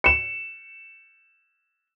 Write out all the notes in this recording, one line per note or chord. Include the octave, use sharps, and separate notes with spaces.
C#7 E7